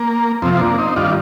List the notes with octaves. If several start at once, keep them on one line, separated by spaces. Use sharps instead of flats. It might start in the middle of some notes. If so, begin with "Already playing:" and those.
Already playing: A#3
F2 C3 F3 C4
C4
A#3 D4
C4 D#4
G2 D#3 D4 F4